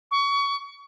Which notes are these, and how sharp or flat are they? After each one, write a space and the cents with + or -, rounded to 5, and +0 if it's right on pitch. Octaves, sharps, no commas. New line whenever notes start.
C#6 +25